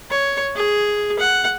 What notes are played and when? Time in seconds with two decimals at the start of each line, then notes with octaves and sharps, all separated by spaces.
0.11 C#5
0.56 G#4
1.19 F#5